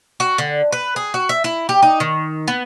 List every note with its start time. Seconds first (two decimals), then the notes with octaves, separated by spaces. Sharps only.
0.20 F#4
0.38 D3
0.72 B4
0.96 G#4
1.14 F#4
1.29 E5
1.44 E4
1.69 G4
1.83 D#4
2.00 D#3
2.48 B3